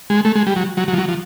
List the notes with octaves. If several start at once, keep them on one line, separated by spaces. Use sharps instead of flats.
G#3
A3
G#3
G3
F#3
F#3
F#3
F3
F#3
F3